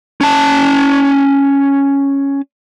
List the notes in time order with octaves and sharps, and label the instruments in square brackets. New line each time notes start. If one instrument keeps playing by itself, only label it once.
[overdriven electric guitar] C#4 A5